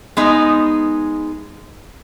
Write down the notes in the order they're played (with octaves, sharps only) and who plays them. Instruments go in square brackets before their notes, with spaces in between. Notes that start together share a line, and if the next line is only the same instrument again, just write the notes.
[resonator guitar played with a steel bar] G#3 B3 D#4